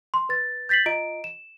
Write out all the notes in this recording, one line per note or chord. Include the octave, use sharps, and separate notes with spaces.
C6
B4 A6
G6 A6 B6 C7 F#7
F4 D#5 D7
E7